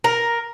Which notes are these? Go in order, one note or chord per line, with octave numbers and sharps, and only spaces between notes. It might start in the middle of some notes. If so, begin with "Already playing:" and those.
A#4